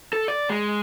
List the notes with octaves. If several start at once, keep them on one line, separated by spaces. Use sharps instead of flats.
A4
D5
G#3